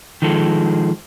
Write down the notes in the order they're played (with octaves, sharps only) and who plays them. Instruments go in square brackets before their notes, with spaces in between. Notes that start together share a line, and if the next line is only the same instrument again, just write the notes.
[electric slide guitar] D#3 F3 G#3 A4